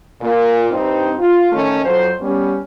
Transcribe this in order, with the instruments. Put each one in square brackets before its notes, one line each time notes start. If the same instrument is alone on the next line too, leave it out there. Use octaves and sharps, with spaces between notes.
[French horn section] A#2
G2 C4 D#4
F4
D#3 A3 C#4
F2 F#3 C5
G3 B3 C#4